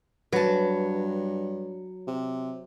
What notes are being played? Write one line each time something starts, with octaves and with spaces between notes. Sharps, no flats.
G2 F#3 B4 A5
C3